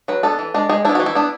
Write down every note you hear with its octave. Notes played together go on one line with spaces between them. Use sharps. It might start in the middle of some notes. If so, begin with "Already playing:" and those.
F#3 B4
B3 D4 A4
E3
G#3 D4
G#3 G#4
B3 D4 E4
E3 F#4
E4
B3 D4